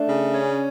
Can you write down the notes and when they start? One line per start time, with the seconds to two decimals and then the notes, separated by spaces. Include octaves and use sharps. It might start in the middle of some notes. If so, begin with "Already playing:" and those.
Already playing: A3 D4
0.08 C#3
0.33 C#4